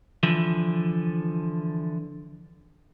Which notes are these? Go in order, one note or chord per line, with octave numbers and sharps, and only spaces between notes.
D3 E3 F3